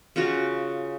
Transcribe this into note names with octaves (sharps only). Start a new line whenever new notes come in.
C#3 C#4 F4 F#4